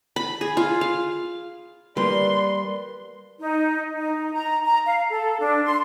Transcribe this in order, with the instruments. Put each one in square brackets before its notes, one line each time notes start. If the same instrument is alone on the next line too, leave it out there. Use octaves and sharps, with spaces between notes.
[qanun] B5
G#4
F4
F5
[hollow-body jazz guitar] G3 A#3 [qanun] B4 [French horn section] D5 [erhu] C6
[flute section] D#4
D#4
A#5
A#5
F5
A4
D4
C6